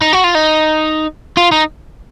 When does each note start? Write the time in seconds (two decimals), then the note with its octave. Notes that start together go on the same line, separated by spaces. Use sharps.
0.01 D#4
0.13 F#4
0.24 F4
0.35 D#4
1.37 F4
1.52 D#4